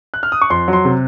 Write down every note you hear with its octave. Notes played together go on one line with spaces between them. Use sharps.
F#6
F6
D#6
C#6
F2 C6
F#3
C6
C3